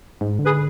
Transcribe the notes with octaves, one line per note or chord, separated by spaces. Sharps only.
G#2
D3
G#4 B4